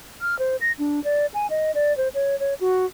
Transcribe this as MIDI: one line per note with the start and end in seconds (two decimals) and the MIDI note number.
0.21 0.38 89
0.39 0.56 72
0.61 0.72 94
0.79 1.03 62
1.04 1.26 74
1.34 1.47 80
1.50 1.71 75
1.75 1.95 74
1.97 2.08 72
2.14 2.39 73
2.40 2.54 73
2.61 2.86 66